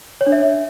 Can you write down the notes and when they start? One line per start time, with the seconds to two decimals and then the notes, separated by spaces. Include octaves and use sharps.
0.21 C#5
0.27 D4
0.32 E5